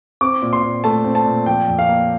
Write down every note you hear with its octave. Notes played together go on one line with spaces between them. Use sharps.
C4 D6
A#2
C6
A#2
A3 A5
C4
A5
A#2
F3 G5
F2
F5
A#3